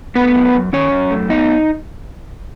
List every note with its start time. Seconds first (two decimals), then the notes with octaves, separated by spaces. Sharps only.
0.15 A3 B3 B4
0.35 F#2
0.54 F#2
0.73 D#3 C#4 C#5
0.91 F#2
1.11 A3
1.29 B3 D#4 D#5